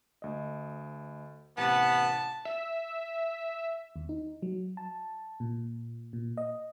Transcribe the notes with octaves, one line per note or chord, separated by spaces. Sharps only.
D2 D#5
A1 C3 B3 A5 D6
E5
D#2
D#4
F#3
A5
A#2
A#2
D#5